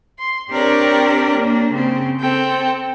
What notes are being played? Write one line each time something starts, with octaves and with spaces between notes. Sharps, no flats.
C6
C4 D4 G4 A#4 C#5 D5
A#3 D4
C#3 C4
C4 A4 G5